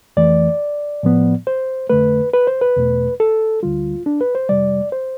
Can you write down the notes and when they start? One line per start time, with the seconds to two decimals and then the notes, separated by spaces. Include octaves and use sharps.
0.17 F2 E3 A3 D5
1.03 A2 F3 B3
1.47 C5
1.90 F2 D3 A3 B4
2.34 B4
2.47 C5
2.61 B4
2.76 E2 B2 A3
3.20 A4
3.63 D2 D3 G3 F4
4.06 D4
4.21 B4
4.35 C5
4.49 F2 C3 G3 D5
4.92 C5